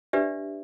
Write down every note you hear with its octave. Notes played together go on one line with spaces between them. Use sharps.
D4 G4 B4 D5 E5